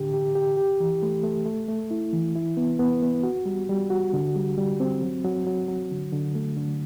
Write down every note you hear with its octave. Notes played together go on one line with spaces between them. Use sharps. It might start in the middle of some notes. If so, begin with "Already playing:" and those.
Already playing: A2 D3 G4
G4
G4
G4
E3
A3
A3
A3
A3
E4
E3
E4
B3
B3
B3
F#4
G3
G3
F#4
D3
G3
G3
C4
F#3
F#3
F#3
F#3
D3
D3
A3
D3